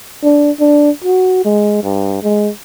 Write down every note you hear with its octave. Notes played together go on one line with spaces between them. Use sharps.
D4
D4
F#4
G#3
G2
G#3